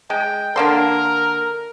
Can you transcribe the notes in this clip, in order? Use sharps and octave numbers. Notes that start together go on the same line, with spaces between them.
G#3 G5
D3 A#3 A#4 C6